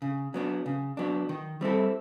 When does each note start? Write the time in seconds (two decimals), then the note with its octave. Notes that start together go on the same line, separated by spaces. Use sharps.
0.02 C#3
0.34 F#3 B3 D4
0.66 C#3
0.97 F#3 B3 D4
1.29 D#3
1.61 G3 C4 E4 A4